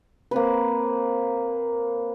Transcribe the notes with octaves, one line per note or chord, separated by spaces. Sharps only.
A#3 C4 B4